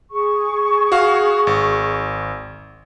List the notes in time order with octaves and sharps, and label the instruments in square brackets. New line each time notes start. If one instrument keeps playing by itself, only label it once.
[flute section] G#4 C#6
[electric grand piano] F#4 F5
G#1